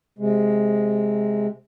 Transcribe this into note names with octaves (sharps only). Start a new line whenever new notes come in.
C3 G#3